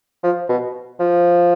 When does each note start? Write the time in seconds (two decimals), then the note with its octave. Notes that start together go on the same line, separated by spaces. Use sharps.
0.24 F3
0.49 B2
1.00 F3